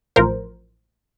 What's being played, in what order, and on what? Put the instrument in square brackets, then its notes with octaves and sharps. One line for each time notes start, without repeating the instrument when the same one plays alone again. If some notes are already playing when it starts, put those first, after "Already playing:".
[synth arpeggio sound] A1 A2 F3 A#4 C5